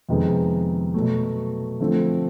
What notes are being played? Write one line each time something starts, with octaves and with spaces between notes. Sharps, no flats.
F2 C3 D#3 G#3 B3
B2 F#3 A3
D3 F3 A3 C4